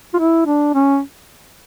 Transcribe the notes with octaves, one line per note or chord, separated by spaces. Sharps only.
F4
E4
D4
C#4